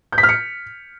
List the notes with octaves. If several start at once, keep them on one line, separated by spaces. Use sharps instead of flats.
G6
B6
F6
C#7